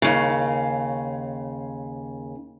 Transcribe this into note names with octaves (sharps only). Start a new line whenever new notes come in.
D#2 C#3